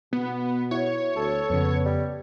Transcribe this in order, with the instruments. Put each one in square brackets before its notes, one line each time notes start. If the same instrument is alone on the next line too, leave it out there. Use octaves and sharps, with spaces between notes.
[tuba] B2 [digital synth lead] B3
[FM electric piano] E4 F#4 [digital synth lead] C#5
[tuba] D2 [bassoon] A4
[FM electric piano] F2 C#3 [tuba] B3
[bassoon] G3